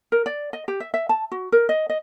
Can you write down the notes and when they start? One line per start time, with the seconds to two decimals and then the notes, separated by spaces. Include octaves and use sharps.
0.12 A#4
0.26 D5
0.53 D#5
0.68 G4
0.80 E5
0.94 E5
1.09 A5
1.32 F#4
1.52 A#4
1.69 D#5
1.90 D#5